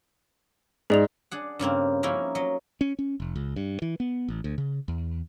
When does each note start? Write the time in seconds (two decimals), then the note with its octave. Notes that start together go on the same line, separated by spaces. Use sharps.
0.90 G#2 G#4 D5 F7
1.31 D4 G#4 F#5
1.59 G2 C#3 A#3 C4
2.03 F3 A#3 C#4 D#4 E4 A#4
2.35 F#3 D#5
2.81 C#4
2.99 C#4
3.20 F1
3.36 C#2
3.56 G2
3.82 E3
4.00 B3
4.28 A1
4.44 D2
4.58 C#3
4.88 E2